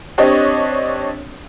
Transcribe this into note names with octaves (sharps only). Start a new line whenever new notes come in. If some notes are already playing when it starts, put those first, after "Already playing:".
C4 D4 G4 C#5 D#5